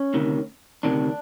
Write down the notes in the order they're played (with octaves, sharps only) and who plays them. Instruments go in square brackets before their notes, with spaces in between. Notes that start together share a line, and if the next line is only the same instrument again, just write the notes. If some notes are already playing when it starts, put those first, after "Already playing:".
Already playing: [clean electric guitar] C#4
D2 C3 D#3
D2 C3 D#3 D4